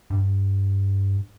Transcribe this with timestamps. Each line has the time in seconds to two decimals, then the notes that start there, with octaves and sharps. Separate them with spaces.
0.10 G2